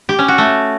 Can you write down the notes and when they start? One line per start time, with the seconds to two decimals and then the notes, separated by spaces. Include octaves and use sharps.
0.09 G4
0.19 C#4
0.28 F#4
0.38 A3